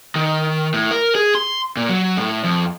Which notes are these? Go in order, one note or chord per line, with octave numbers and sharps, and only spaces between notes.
D#3
A2
A#4
G#4
C6
A#2
F#3
A2
F2